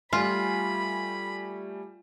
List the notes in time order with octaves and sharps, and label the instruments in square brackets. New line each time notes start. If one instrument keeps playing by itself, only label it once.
[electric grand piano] G3 A3 G#5 [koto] F4 [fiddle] B5